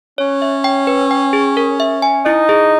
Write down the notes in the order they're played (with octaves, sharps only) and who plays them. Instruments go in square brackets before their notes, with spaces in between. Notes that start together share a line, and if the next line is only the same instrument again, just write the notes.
[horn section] C#4 [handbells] C#5
[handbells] E5
G5
B4
G5
G#4
A#4
E5
G#5
[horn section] D#4 [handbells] E4
[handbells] G#4